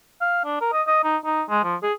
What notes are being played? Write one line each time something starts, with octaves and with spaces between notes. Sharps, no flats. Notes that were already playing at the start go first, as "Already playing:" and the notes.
F5
D4
A#4
D#5
D#5
D#4
D#4
G#3
F3
G#4